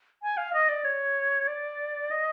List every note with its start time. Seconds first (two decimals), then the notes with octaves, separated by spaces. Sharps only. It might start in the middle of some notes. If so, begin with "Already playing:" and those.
0.23 G#5
0.37 F5
0.53 D#5
0.69 D5
0.84 C#5
1.48 D5
2.11 D#5